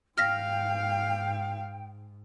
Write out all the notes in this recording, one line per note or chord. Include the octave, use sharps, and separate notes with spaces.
G#2 F5 G5 F6 A#6 B6